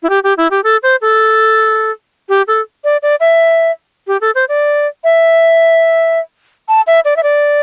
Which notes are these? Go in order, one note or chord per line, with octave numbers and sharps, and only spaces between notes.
E4
G4
G4
E4
G4
A4
C5
A4
G4
A4
D5
D5
E5
G4
A4
C5
D5
E5
A5
E5
D5
E5
D5